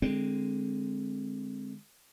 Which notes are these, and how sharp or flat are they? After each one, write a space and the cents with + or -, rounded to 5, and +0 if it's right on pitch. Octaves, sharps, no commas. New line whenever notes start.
D3 +20 G#3 +0 C4 +0